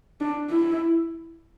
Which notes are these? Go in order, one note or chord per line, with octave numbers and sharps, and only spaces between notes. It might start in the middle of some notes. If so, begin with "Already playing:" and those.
D4
E4